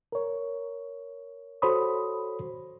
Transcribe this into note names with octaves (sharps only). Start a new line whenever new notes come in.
A#4 C#5
F#4 A4 C5 C#5 B5 D#6